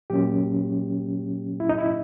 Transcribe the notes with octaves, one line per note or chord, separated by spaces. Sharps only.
A#2 F#3 A#3 C#4 G4
E4
D#4
E4